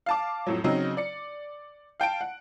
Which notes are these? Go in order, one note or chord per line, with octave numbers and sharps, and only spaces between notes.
F5 A5 D6
F2 A2 F#3
C#3 F#3 C4 D#4
D5 C#7
F5 G5 A5 D7
F#5